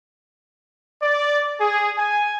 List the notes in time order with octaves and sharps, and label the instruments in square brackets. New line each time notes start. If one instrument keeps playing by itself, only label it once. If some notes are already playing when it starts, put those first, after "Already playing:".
[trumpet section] D5
G#4
G#5